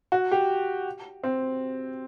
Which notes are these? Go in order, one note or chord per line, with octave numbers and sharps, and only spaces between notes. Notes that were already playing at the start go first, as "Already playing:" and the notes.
F#4
G4
C4